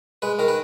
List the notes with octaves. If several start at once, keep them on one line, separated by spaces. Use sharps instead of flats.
G#3 B4
D#3 A#4
B4